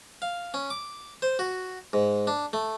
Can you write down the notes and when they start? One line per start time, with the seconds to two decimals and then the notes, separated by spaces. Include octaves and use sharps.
0.22 F5
0.54 C#4
0.70 D6
1.22 C5
1.39 F#4
1.93 G#2
2.27 D4
2.53 A3